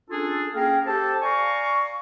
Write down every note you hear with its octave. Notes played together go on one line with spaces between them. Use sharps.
C#4 D4 F4 G#4 A4
A#3 C#4 G#4 A#4 F5 G5
G4 A4 C5 G5 A5
D5 F5 G#5 A#5 C#6